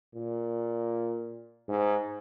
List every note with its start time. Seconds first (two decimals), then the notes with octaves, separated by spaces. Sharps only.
0.15 A#2
1.69 G#2